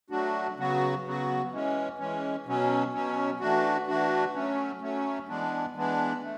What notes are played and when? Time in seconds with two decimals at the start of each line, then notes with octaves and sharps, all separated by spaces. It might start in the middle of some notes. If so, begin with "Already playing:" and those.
0.10 F#3 A3 D4 F#4
0.57 C#3 F#3 B3 F#4
1.04 C#3 F#3 B3 F#4
1.51 E3 G#3 C#4
1.99 E3 G#3 C#4
2.46 B2 F#3 C#4
2.93 B2 F#3 C#4
3.40 E3 A3 D4 F#4
3.87 E3 A3 D4 F#4
4.34 F#3 A3 C#4
4.81 F#3 A3 C#4
5.28 E3 G#3 B3 D4
5.76 E3 G#3 B3 D4
6.23 A3